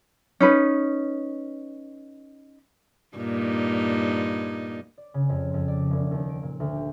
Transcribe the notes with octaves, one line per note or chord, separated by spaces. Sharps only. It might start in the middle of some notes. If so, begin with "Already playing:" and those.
C#4 D#4 B4
G2 A#2 D#4
D5
C#3
F2
F2
D5
E1
D#2
D7
A#2
D2
G4